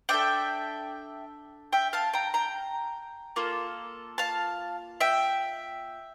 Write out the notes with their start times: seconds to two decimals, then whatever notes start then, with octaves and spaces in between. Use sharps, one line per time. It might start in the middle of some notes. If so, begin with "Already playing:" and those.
0.09 D4 A4 E5 G5
1.73 E5 G5
1.93 F5 A5
2.13 G5 A#5
2.34 G5 A#5
3.36 A#3 F4 A4
4.18 F5 A5
5.01 E5 G5